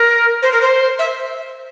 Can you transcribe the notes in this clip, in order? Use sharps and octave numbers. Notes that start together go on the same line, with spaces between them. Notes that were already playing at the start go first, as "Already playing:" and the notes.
Already playing: A#4
C5
A#4
C5
E5